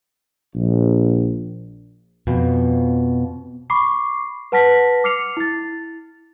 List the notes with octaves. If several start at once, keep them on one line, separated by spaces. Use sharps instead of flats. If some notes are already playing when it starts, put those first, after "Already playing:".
A#1
F2 B2 F3
B5 C#6 D6 C7
B4 F#5 A5 F6 A#6 B6
D6 F6 C7 C#7 F7
E4 A6